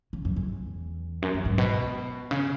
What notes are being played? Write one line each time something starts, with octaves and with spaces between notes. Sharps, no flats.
C#3
F#2
E2
F#2
F#2
G#2
B2
C#3